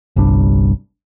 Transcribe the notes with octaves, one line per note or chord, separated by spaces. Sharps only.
G1 C2 G3 D4